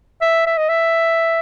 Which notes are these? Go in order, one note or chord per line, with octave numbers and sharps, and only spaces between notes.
E5
E5
D#5
E5